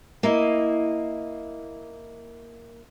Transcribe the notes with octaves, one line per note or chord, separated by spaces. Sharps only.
A#3 E4 D#5